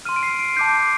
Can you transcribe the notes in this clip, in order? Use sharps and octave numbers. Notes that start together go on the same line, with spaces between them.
C6 F6 D#7
D7
C7
D7
A5 D6 G6 C7
D7